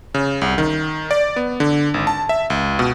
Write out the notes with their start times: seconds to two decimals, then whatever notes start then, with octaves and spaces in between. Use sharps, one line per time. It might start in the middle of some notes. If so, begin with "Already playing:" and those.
0.14 C#3
0.42 C2
0.58 D#3
1.11 D5
1.36 B3
1.60 D3
1.94 G#1
2.07 A5
2.29 E5
2.50 C#2
2.79 B2